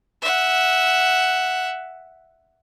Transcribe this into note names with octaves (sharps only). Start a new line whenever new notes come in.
E5 F#5